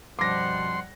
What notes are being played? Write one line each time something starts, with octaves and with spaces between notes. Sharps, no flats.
F#2 B2 F3 G3 F#5 C6 D6 A#6